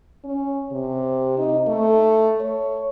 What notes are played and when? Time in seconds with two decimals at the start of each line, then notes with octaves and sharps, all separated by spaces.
0.24 C#4
0.72 C3
1.38 D#4
1.67 A3
2.40 C#5